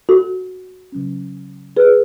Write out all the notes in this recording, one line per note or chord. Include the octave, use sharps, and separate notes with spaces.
F#4 A4
C#3 F#3 C#4
G#4 B4